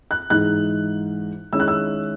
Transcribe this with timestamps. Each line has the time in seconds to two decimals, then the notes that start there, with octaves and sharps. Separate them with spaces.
0.11 F#6
0.30 G#2 E3 G#3 D#4 F#6
1.53 D#3 G#3 C#4 E4 E6
1.60 F#6
1.68 E6